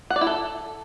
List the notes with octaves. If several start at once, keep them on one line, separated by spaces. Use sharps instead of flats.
F#5
D5
E4
A4